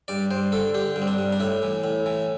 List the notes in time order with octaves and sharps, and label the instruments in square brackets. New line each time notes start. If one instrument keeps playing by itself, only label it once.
[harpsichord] G2 D5
G2 C5
D3 A4
D3 G4
G2
C4
D4
G2
D4
A2 E4
E3
A2
E3